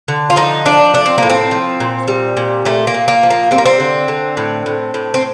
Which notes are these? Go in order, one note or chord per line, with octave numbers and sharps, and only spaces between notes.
D3
F4
F3 D#4
F3 D4
A3 D4
C4
A2 A#3
C4
F3
A#2
G3
A#2
A#2 A3
A#3
A#2
A#3
F3
A#3
G3 C4
A#3
C4
D3
D3
A2
A2
A2
C4